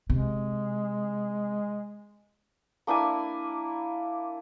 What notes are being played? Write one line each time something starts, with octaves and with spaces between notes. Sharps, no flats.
C3 G#3
A#3 D4 E4 G#5